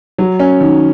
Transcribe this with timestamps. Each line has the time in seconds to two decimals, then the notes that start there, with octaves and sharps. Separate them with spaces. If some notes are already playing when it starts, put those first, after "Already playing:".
0.18 F#3
0.39 C#4
0.60 D#3